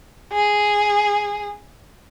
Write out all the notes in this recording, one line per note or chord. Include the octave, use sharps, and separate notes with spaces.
G#4